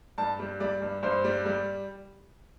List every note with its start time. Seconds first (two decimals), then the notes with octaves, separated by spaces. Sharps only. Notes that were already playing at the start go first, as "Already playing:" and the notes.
0.18 G2 A5
0.39 G3
0.60 G3 D5
0.82 G2
1.03 G2 C5
1.24 G3
1.45 G3